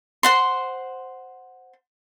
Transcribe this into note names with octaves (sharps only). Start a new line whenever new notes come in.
C5 F#5 C6